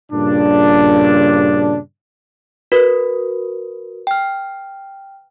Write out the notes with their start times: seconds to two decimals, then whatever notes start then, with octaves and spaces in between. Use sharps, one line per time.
0.12 G2 A#2 C#3 D4
2.72 F#4 A#4 B4
4.07 G5 F6